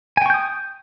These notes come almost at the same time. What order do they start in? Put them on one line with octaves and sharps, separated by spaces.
G#5 G5 C#6 G6 D#6